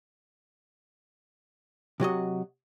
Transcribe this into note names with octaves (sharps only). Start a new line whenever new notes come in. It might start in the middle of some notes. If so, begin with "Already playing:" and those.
C3 F#3 F#4 D#5